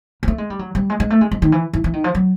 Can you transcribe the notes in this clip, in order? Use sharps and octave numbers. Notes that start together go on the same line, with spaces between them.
A#3
A3
G#3
G3
F#3
G3
G#3
G#3
A3
G#3
G#3
D#3
E3
E3
E3
D#3
F3
F#3